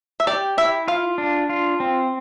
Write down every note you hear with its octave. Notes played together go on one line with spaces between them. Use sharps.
E5
G4 D5
E4 E5
F4 F5
D4
F4
C4